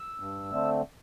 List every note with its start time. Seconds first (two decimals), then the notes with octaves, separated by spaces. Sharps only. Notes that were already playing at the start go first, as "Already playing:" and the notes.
Already playing: E6
0.20 G2
0.51 D3 A3 C4